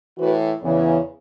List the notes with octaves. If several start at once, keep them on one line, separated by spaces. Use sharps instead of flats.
A2 E3 F#4 B4
E2 C#3 E3